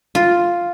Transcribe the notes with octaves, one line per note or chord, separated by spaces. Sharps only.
F4